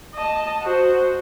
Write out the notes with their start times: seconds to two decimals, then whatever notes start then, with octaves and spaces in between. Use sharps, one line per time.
0.15 D#5 A5
0.62 F#4 C5